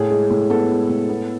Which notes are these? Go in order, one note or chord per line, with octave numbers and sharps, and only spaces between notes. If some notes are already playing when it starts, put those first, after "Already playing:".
Already playing: A2 G#4
G#3
A2
B3 A4
G#3
A2
B3